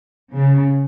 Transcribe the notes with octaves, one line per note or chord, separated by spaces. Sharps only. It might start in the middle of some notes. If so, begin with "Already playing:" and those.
C#3